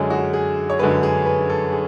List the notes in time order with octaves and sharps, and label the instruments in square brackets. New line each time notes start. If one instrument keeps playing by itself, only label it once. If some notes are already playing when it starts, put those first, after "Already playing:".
Already playing: [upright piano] F#2 D3 G#3 C#4 G#4
F#4
G#4
C#5
F#2 D3 G#3 C#4 B4
G#4
B4
A4
G#4